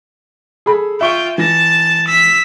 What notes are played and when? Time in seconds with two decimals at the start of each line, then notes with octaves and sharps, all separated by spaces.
0.66 G#4 A4 B5
1.01 F4 E5 G5 C#6 G7
1.38 E3 A5 A#6
2.08 E6 B6